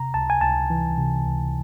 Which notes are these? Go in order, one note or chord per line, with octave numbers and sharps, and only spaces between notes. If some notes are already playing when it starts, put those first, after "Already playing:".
Already playing: C3 A#5
C#2 A5
G#5
C#2 A5
E3
C3
C#2